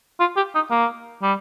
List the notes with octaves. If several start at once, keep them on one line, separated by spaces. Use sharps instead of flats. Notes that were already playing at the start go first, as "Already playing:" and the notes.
F4
G4
D#4
A#3
G3